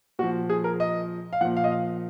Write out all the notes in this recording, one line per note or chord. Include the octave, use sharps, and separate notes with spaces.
A#2 F3 F#4
G#4
A#4
D#5
F5
A#2 F3 F#5
F5
D#5
F5